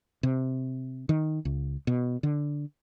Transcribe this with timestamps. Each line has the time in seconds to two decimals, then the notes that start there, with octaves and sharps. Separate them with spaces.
0.23 C3
1.09 D#3
1.45 C#2
1.87 B2
2.23 D3